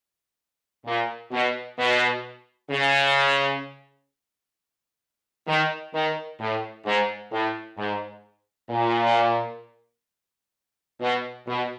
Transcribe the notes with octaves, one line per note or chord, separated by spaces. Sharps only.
A#2
B2
B2
C#3
D#3
D#3
A2
G#2
A2
G#2
A#2
B2
B2